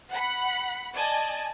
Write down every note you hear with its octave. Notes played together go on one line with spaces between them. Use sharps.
F#5 B5 C#7
D5 D#5 G#5 A5